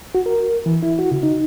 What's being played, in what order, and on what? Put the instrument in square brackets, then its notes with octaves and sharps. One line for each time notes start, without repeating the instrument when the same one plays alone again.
[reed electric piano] F#4
A#4
E3
E4
F#4
C#3
D#4